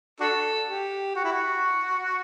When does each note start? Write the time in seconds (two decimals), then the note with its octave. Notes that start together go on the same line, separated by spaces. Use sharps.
0.20 D4 F#4 A4
0.68 G4
1.15 F#4
1.24 E4
1.32 F#4